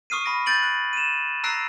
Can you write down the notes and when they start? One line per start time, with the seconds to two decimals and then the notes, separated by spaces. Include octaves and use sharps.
0.10 C#6 D#6 F6 C7 D#7
0.24 B5 A#6 D7
0.46 G6 A6 D7 F#7
0.63 F#6
0.93 D#7 E7
1.44 A#5 E6 F#6 A#6 C7 D7